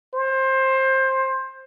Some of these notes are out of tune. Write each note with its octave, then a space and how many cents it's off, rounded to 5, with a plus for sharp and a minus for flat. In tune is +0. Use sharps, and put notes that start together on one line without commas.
C5 +20